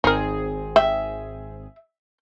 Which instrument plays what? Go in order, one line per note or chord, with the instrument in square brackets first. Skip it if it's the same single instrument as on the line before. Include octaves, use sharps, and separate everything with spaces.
[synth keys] G#1 C4 G#4 [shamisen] D#4 A#4
[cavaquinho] E5 [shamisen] G5